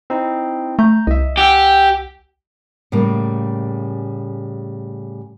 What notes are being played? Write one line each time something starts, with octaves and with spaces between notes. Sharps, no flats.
C4 D#4 E4
A3 A#5 G6
C2 D#5 E5
G4 F#5 G#5 E6
A2 C#3 G3 A#3